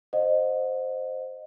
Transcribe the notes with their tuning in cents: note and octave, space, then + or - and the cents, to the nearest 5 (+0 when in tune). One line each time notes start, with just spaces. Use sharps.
C5 +0 D#5 -20 F#5 -40